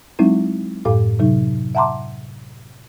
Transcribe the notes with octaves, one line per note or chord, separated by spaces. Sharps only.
F#3 G#3 C4 D#4 E4
F#2 A2 A4 F5 D6
C3 F#3 D#4
E5 F#5 A5 A#5 C6 D6